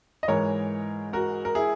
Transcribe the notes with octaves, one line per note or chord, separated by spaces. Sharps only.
D#5
G#2 E3 G#3 A#4 C#5
F#4 A#4
A#4
E4 G#4